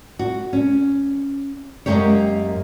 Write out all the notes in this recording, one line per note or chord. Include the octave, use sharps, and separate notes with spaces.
F#4
C#4
F#2 D#3 G#3 A#3 G4 C#5